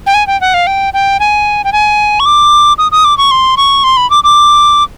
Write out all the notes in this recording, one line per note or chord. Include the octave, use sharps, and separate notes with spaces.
G5
G#5
G5
F#5
F5
G5
G5
G#5
G5
G#5
C#6
D6
D#6
D#6
D6
C#6
C6
C#6
C6
B5
D6
D6